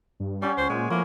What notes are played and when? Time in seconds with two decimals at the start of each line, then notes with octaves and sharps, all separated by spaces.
0.20 G2
0.42 G3 C#4 F#4 G4
0.57 C#2 C5
0.69 A#2 G#3 C5 G#5
0.90 A2 F3 G#3 A#3